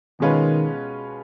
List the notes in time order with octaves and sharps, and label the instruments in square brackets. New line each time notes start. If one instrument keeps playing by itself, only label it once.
[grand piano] B2 G#3 C#4 F4 B4 [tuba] D#3